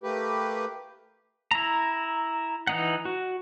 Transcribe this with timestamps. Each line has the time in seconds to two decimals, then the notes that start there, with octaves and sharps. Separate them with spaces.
0.03 A3 A#3 G4 B4
1.51 E4 A#5
2.67 E3 D#4 F#5
3.05 F#4